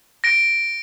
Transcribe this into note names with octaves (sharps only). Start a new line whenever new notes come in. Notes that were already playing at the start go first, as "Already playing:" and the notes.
A#6 D7